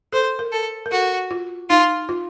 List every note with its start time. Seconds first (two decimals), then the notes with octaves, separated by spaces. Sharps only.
0.13 A4 C5
0.39 A#4
0.52 A4
0.86 A#4
0.92 F#4 A4
1.31 F4
1.70 D#4 F4
2.09 F4